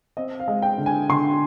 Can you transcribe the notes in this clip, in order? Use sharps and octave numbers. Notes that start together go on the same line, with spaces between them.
C4 D#5
F5
G#3
G5
D3
G#5
D3 C6